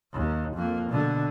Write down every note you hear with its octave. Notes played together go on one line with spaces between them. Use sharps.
D#2
F2 A#3
B2 D3